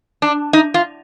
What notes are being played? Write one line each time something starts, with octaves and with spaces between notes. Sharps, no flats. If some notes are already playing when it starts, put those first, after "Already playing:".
D4
D#4
F4